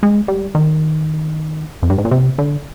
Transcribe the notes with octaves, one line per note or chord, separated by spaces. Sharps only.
G#3
G3
D#3
F2
G2
G#2
A#2
C3
D3